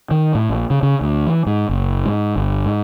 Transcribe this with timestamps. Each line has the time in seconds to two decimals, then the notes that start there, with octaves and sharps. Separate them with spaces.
0.11 D#3
0.35 A2
0.50 A#1
0.70 C#3
0.83 C#3
1.01 D2
1.27 E3
1.46 G#2
1.69 F#1
2.06 G#2
2.36 G1
2.66 G#2